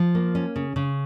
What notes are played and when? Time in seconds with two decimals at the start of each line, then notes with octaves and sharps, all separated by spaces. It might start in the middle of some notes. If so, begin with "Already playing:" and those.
Already playing: F3
0.15 A#3
0.35 C#4
0.56 C#3
0.76 C#3